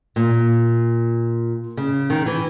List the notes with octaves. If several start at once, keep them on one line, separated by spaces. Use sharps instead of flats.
A#2
C#3
D#3
E3